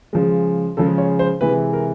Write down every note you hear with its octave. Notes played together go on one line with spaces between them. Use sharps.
C#3 F3 G#3
C#3 F3 G#3 A4
C#5
C5
C3 E3 G#3 B4
A#4